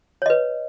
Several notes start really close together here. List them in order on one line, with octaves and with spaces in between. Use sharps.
C#5 D#5 B4